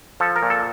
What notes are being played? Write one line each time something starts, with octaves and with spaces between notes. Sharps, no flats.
F3 A4
A#4
A#2
A4